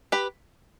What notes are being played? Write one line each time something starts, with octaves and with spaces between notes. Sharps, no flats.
G4 B4